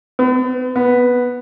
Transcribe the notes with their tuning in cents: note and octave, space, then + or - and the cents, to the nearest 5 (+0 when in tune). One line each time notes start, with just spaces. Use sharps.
B3 +40
B3 -5